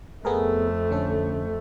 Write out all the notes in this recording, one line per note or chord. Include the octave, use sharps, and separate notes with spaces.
F2 A3 B3 G#4 A#4
D3 C#4 A4